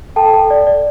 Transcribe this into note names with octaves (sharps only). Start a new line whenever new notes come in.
A4 G5 A5
A4
D5
D5